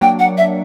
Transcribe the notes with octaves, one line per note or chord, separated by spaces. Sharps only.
F#3 A#3 D4 G5
F#5
E5